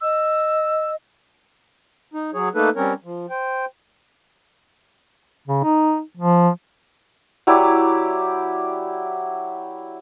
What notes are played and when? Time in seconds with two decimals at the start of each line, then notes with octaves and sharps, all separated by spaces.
0.01 D#5 E6
2.14 D#4
2.34 F#3 G#4 C#5
2.55 A3 A#3 D#4 A4 B4
2.76 G3 C4 C#4 A#4 C#5
3.04 F3
3.30 C5 G5
5.47 C#3
5.64 D#4
6.17 F3
7.47 F#3 E4 G4 D5